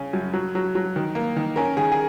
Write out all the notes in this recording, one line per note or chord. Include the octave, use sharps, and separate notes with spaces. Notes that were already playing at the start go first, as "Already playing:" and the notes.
Already playing: C#3 C#4
F#2
F#3
F#3
F#3
D#3
A#3
D#3
C#4 A#4
D#3 G#4
G#4